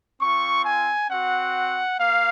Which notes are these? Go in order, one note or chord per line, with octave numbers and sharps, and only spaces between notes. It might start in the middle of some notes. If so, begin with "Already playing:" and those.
C4 F4 C#6
G#5
C4 F#4 F#5
A#3 F5